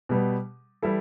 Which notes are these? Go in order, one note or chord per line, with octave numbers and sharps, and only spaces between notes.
B2 G3 B3
E3 G3 E4 A4